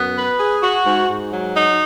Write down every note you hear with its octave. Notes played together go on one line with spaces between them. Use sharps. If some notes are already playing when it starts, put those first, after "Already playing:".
Already playing: F#2 B3
B4
G#4
F#4
G#2
G#2
F#3
D#4